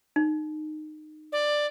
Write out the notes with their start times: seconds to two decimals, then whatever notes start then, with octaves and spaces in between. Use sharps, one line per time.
0.16 D#4
1.32 D5